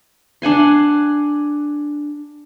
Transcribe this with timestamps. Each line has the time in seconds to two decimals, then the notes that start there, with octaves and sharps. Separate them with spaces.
0.42 D4 F#5 G#5 C6